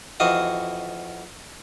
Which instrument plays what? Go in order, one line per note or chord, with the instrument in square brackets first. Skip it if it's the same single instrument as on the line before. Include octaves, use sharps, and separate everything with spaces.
[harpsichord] F2 E3 F#4 D#5 F5